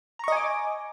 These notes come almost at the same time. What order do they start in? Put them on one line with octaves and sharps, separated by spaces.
A#5 C#6 D#5 G#5 D6